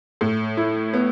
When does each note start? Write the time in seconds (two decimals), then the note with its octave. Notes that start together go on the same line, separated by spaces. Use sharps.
0.21 A2
0.57 E4
0.93 B3